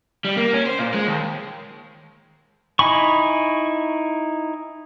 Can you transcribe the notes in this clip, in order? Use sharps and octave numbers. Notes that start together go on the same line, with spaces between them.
G3
A#3
C#4
C5
A#2
G#3
D#2
D#4 E4 G#5 B5 C#6